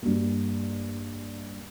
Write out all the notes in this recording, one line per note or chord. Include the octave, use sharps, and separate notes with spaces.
G2 G3 A#3